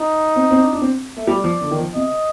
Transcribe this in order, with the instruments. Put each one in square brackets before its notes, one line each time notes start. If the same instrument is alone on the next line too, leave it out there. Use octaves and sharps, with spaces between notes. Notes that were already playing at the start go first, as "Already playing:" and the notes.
Already playing: [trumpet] D#4
[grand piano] C4
C4
D4
D4
C4
A3
[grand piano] G3 [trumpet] D5
[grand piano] F3
D3
D#3
F3
[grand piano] C3 [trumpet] D#5